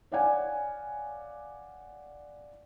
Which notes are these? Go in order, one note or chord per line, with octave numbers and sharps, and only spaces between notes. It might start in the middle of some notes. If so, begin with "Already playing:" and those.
C#5 D5 F5 F#5 G#5